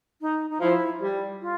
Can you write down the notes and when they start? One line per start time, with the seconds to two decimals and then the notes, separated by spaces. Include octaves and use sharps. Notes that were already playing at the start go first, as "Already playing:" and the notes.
0.21 D#4
0.50 D#4
0.61 F3 E4
1.01 G3
1.41 F4